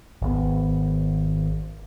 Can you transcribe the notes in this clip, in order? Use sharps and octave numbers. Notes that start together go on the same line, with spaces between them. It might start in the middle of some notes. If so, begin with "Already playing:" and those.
G#1 B3